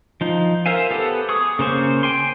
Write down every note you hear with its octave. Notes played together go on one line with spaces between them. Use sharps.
F3 D#4
A#4 C5 E5 F5 G#5
B3 G4 A4
G#4 C#6 D#6
C#3 A#3 C5 C#6
G5 G#5 C6